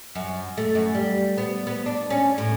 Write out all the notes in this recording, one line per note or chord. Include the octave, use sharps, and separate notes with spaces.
F#2
A3
F#2
G3
B3
B3
D4
C#4
A2